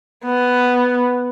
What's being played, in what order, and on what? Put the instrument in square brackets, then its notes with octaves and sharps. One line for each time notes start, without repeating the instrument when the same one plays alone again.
[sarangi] B3